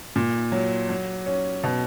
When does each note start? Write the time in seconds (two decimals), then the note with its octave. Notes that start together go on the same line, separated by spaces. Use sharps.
0.16 A#2
0.52 F#3
0.89 F#3
1.26 C#4
1.64 B2